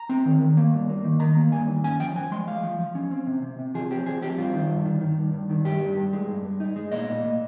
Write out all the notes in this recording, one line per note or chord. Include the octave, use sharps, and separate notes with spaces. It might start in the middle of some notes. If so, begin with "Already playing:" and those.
Already playing: A#5
C4
D#3
D#3
A#3
G2
A#3
D#3
D#3 A#5
A#3
G2 G#5
D#3
C#4 G#5
F3 G5
F3 G#5
G#3 C6
G#3 F5
F3
F3
C#4
C4
C3
C3
C3
F3 G#4
C4 G4
F3 G#4
C4 G4
G2 F4
D#3
G2
D#3
D#3
G2
G2
D#3
G2 G4
G2
G2
G#3
G2
G2
D#4
G#3
A#2 D#5
A#2
A#2